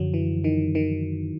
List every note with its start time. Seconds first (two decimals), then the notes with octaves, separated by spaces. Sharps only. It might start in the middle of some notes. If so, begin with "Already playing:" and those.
Already playing: F#2 D3 F3 F#3
0.14 E3
0.44 D#3
0.75 D#3